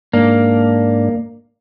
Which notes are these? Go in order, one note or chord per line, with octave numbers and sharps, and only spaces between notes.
G#2 A#3 D4